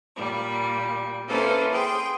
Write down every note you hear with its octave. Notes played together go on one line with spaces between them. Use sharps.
A#2 G3
A#3 C#4 E4 A4 B4 C5
G#4 G5 C6